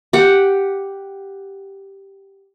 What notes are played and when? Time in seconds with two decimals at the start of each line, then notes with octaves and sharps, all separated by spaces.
0.13 G4 F#5